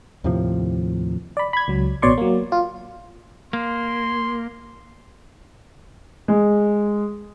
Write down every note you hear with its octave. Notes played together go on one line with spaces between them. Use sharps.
D#2 A2 C3 F3
D5 B5
B5 G#6
C#2 F#3
A1 B2 C#5 D5 C6 C#6
F#3 A#3
F4
A#3 C6
G#3